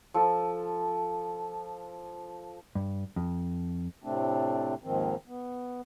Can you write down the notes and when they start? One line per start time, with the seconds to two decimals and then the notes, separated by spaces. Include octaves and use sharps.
0.14 F3 A4
2.75 G2
3.16 F2
4.04 A2 C3 A3 C4 D4
4.84 D#2 G#2 D#3 F3 C4
5.27 B3